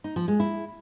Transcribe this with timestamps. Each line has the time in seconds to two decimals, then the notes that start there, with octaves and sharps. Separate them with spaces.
0.04 D#4
0.16 F3
0.28 G#3
0.40 E4